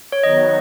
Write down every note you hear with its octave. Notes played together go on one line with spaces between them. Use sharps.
C#5
D#3 F#3 B3 D#4 F#4 D#5